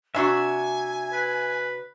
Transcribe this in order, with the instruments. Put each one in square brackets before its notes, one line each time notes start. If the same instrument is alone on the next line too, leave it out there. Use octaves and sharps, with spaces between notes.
[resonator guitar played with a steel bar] C3 D4 F#4 [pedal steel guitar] E5 [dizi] G#5
[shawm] B4